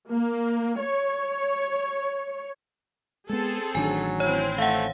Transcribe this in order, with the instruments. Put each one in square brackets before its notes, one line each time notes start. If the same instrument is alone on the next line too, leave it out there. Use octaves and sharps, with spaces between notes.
[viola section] A#3
C#5
[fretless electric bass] G#3 B3 [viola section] C4 G#4 A4
[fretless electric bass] A1 D#3 D4 [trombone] F#3 [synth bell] G#5
[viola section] C4 E4 [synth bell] C#5
[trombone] A3 [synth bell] F5 F#5